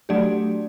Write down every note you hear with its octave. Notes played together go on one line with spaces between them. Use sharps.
F#3 A3 D4 G4 D5